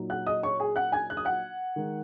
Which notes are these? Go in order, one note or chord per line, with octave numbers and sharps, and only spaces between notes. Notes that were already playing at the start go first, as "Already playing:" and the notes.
Already playing: A#2 F#3 D#4
F#5 F#6
D#5 D#6
C#5 C#6
G#4 G#5
F#5 F#6
G#5 G#6
F#6
D#6
F#5 F#6
D#3 G#3 D#4